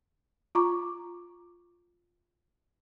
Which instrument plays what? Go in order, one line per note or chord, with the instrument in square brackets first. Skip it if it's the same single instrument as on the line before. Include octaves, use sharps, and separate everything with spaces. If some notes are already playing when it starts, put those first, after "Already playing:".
[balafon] F4 A#5 C#6 D6